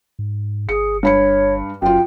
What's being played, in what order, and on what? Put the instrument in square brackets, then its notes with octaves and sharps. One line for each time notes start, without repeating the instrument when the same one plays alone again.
[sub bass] G#2
[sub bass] G1 [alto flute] G#4 [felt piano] C#7
[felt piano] G2 B5 C#7 [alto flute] C#5
[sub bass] F#1 [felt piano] F#2 F4 [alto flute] G5